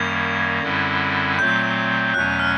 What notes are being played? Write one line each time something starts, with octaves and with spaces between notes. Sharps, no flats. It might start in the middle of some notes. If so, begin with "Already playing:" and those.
Already playing: F#2 D#3 G3 A#3 G#6
F#2 D3 G3 C4 E4
A#2 F#3 A3 C4 G6
E2 B2 F#3 A3 C#4 F#6
F6